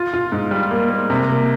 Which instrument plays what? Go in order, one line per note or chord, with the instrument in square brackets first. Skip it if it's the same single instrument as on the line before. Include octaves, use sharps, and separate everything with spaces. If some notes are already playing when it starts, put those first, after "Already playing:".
Already playing: [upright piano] F4
F4
G#2
G3
A#3
A#3
C3
A#3